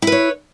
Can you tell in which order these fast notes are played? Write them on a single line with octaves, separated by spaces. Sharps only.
E4 B4 C#5